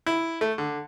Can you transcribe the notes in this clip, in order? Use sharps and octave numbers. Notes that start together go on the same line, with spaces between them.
E4
A3
D3